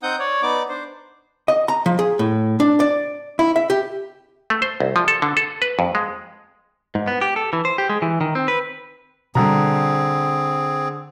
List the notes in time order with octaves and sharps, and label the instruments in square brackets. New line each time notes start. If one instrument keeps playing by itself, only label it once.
[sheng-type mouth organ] C4 D#4 F#5 D#6 G6
C#5 D5
B3 D#4 D5 D6
D4 C5
[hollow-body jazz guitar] D#5
A#5
F3
G#4
A2
D4
D5
E4
E5
G4
[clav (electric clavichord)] A3
C5
C2
F3
A4
D3
A4
B4
F2
G#3
[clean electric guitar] G#2
B3
G4
A4
E3
C5
G4
G#3
E3
D#3
C4
B4
[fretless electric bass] B2 G3 [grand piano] D3 A#5 [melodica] C4 G#4